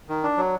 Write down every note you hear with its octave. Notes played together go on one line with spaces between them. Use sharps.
D#3
D4
F#3